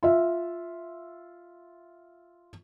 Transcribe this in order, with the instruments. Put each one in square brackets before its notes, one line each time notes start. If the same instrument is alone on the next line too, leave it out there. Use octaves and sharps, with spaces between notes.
[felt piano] F4 E5